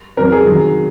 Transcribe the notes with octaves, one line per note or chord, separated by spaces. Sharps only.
F2 C3 F#3 A#4
G#4
C3 D#3 F#3